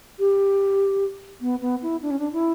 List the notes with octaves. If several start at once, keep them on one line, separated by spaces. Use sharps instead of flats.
G4
B3
B3
E4
D4
C#4
D4
E4